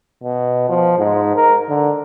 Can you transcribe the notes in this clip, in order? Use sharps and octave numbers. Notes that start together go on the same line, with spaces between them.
B2
F3
G#2
A#4
D3